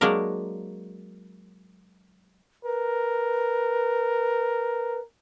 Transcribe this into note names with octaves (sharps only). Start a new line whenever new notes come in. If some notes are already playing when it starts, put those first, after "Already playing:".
F#3 G#3 A#3 D4 A#4
A#4 B4